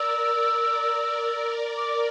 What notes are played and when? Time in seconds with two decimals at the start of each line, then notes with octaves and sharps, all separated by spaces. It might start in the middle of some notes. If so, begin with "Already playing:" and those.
Already playing: A#4 D5 E6
0.10 A#4
1.77 D6